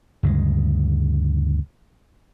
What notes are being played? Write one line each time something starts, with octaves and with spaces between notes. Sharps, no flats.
D2 G2 C#3 G#3